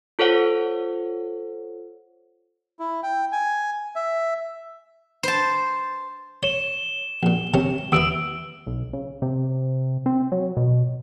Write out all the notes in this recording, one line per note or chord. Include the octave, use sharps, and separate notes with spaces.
F4 A4 C5 C#5 F#5
E4
G5
G#5
E5
C5 A5
C#5 E7 G7
A#1 A#2
C3 D#3 C#4
D#2 E3 E4 D#6 E6 D7
B1
C#3
C3
C4
F#3
B2